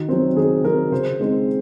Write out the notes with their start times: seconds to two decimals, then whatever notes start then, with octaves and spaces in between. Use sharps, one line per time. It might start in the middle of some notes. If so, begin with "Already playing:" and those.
Already playing: D#3 F#4
0.09 F#3 C4
0.36 D#3 G#4
0.64 F#3 C4 A#4
0.92 C#3 C5
1.20 G#3 C4 D#4